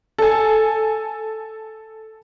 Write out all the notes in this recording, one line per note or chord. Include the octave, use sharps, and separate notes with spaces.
A4 G#5